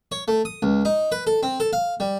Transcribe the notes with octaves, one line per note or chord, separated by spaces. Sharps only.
C#5
A3
D#6
C#2
D#4
B4
A4
C4
A4
F5
G3